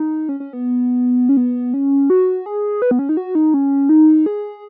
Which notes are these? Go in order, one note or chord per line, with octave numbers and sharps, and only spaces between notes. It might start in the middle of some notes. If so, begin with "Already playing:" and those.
Already playing: D#4
C#4
C#4
B3
C#4
B3
C#4
F#4
G#4
B4
B3
C#4
D#4
F#4
D#4
C#4
D#4
G#4